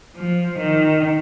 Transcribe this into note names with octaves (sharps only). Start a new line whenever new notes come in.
F3
D#3